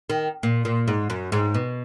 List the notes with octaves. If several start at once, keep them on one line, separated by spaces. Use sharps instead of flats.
D#3
A#2
A#2
G#2
F#2
G#2
B2